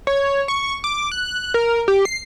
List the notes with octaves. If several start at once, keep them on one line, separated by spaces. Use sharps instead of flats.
C#5
C#6
D6
F#6
A#4
G4
C7